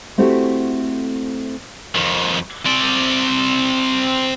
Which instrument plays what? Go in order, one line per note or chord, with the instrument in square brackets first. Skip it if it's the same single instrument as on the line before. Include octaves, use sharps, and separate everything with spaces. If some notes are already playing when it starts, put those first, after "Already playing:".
[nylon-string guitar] A3 C4 E4 F#4 G4 A4
[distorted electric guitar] F2 D#3
C4 D5